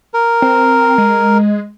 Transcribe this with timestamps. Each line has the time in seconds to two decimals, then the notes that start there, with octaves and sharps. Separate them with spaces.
0.14 A#4
0.42 C4
0.98 G#3